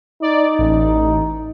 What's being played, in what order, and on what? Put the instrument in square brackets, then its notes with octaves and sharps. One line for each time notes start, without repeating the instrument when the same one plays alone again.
[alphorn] D#4 [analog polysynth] D5
[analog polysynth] A1